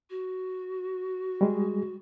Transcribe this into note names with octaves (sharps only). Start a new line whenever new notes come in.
F#4
G3 G#3 G#4